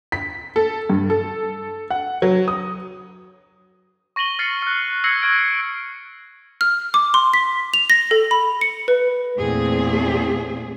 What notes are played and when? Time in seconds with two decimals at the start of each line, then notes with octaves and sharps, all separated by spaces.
0.12 B6
0.56 A4
0.90 G2
1.10 A4
1.90 F#5
2.22 F#3
2.48 D#6
4.16 C#6 A#6 D#7 F#7 G7
4.39 F6 A6 A#6 C7 C#7
4.62 F6 F#6
5.04 E6 G#6 A#6 C7 C#7 F#7
5.22 C#6 F6 G#6 D7
6.61 F6
6.94 D6
7.14 C6
7.34 B6
7.74 F7
7.90 A#6
8.11 A4
8.31 B5
8.61 C#7
8.88 B4
9.38 E2 A#2 A3 C4 G#4